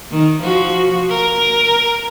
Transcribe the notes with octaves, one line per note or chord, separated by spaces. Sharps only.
D#3
F3 F#4
A#4